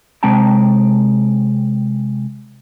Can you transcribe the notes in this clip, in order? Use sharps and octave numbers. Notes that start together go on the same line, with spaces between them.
C3 G#3 C4 G5 A5 A#5